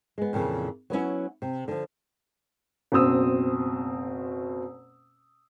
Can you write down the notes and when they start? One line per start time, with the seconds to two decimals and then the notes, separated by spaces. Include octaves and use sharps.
0.18 G#3 B3
0.33 F2 A#2 C#3 E3
0.90 F#3 B3 C#4 E4
1.42 C3
1.68 D3 F3
2.92 F#1 B2 C4 D#6 E6